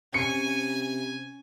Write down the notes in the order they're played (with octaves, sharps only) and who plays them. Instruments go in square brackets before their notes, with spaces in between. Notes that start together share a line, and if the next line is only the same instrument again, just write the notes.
[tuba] C3 [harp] C#4 [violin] G#5 [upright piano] C#7